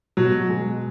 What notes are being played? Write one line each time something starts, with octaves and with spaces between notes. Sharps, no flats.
B2 F#3
G#3